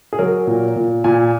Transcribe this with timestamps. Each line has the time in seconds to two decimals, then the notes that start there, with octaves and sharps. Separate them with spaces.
0.13 G#4
0.19 F#3 A#4
0.47 A#2
0.76 A#2
1.04 A#2 G#5